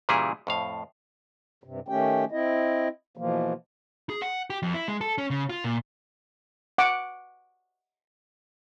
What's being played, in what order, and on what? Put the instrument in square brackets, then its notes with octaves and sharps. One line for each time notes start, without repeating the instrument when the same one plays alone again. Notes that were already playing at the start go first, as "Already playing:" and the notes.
[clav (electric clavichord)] A#2 C#3 E3 G3 E4 G#4
F2 A2 F5
[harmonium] G2 C3
D#3 A3 C#4 G4 G5
C4 E4 D#5
B2 E3 F3 A#3
[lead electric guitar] G#4
F#5
G4
F2
E4
G#3
A4
C#4
C#3
F4
A#2
[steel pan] F#5 D6